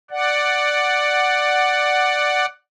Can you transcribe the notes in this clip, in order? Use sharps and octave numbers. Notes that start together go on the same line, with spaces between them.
D5 F#5